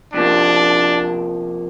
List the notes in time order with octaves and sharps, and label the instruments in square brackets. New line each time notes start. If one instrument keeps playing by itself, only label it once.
[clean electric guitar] F2 C3 F3 A#3 [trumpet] D4